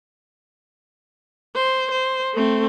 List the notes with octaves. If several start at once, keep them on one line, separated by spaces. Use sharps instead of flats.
C5
C5
A3 C4